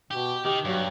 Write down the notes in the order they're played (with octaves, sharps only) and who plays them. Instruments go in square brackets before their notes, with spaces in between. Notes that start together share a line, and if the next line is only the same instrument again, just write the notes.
[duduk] B2 [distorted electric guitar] G4
[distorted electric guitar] D#3 [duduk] G4
[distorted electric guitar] G2 [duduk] F#3